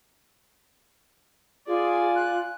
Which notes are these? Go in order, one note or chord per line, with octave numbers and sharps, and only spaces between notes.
F4 G#4 D5 G#5
F#6